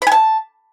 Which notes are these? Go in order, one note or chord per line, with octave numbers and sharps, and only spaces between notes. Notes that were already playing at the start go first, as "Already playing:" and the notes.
G#5 A5 B5